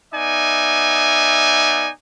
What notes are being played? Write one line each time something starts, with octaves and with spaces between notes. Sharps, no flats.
B3 D#4 D5 E5 G#5